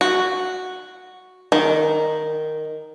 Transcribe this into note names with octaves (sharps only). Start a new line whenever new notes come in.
F#4
D#3